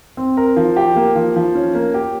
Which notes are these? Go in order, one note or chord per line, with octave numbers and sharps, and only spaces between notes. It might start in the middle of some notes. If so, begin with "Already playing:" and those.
C4
A#4
F3
G4
A#3
F3
F3
C#4
A#3
G4